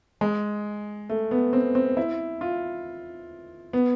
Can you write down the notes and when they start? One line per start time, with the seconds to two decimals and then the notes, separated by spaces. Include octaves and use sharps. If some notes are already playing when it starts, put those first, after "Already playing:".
0.21 G#3
1.10 A3
1.31 B3
1.53 C4
1.75 C4
1.97 E4
2.41 F4
3.73 B3